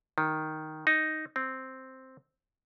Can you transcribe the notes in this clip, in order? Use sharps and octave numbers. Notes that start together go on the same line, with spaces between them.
D#3
D#4
C4